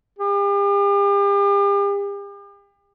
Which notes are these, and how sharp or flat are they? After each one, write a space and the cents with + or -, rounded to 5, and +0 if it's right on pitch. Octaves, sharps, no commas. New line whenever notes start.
G4 +40